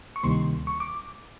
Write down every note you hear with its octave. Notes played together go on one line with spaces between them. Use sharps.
C#6
D2 C3 D#3 G3 A#3 C6
C#6
D6